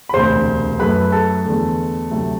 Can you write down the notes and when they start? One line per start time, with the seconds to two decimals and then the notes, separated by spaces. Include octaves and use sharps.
0.09 B5
0.13 E1 D2 C3 C5 C6
0.79 F#2 F#3 A3 B4 B5
1.12 A4 A5
1.45 E2 D3 A3
2.11 D2 C3 F#3 A3